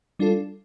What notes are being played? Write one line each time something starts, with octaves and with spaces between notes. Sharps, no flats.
G3 D4 F4 A4